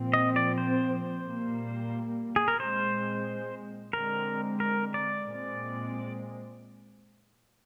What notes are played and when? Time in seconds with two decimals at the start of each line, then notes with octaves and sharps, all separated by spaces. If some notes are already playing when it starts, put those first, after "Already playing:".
Already playing: A#2 F3 C4
0.14 D#5
0.36 D5
0.58 C5
1.25 A#2 G3 A#3
2.36 G#4
2.48 A#4
2.59 A#2 G#3 C4 C5
3.93 D3 G#3 C4 A#4
4.60 A#4
4.94 D5
5.28 A#2 G#3 C4